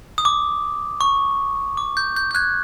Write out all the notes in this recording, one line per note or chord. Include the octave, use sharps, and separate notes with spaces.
D#6
D6
C#6
D6
G6
G6
G6
F#6 G#6